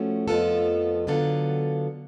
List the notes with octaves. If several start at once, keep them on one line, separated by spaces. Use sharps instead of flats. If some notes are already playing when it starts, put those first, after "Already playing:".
Already playing: F3 A3 C#4 F#4
F2 F3 B3 F4 A4
D3 F#3 B3 F4 A4